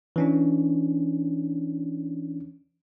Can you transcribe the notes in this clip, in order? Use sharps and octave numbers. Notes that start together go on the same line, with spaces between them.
E3 C#4 D4